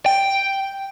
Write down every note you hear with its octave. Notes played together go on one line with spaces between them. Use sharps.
G5